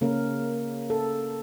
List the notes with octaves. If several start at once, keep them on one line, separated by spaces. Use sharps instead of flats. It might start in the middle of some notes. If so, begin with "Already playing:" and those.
C#3 A#3 C#4 A#4
A4